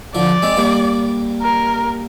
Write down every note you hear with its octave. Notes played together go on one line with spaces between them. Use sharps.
D3 F3 D5
G#3 C4
G3 A#3
A#4